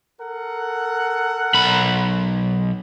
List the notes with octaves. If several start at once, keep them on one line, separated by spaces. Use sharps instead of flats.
A4 A#4 F#5
B1 B5